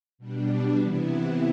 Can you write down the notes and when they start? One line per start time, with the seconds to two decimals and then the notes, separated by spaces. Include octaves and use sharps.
0.18 B2 G3 D4
0.79 C3 E3 B3 E4